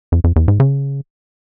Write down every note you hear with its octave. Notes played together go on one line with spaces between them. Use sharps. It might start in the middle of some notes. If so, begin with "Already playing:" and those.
F2
F2
E2
G#2
C#3